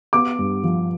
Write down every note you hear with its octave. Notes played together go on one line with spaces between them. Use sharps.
B3 D6
G2
F3